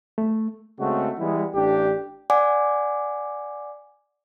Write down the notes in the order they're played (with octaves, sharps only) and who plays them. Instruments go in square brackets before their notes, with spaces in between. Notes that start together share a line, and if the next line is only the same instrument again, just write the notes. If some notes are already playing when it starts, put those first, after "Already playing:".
[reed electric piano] A3
[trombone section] C#3 G#3 A3 C4 F#4
E3 G3 G#3 B3 E4
A1 D4 G4
[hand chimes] D5 F#5 G#5 D6